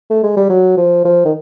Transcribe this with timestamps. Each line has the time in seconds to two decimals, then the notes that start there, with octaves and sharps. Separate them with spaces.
0.10 A3
0.23 G#3
0.37 G3
0.49 F#3
0.77 F3
1.05 F3
1.25 D#3